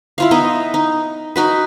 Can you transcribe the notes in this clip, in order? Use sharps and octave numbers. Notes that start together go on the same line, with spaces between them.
E4 F4 F5
B3 D#4 D#5 E5
D#4
D#4 F#4 B4